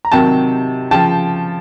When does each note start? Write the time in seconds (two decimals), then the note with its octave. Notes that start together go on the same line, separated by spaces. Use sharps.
0.05 A#5
0.11 C3 D#3 F#3 G5 A5
0.91 C#3 F3 G5 A5